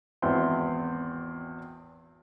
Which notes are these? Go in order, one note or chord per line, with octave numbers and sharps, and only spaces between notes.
G#1 E2 B3 C4 E4 C6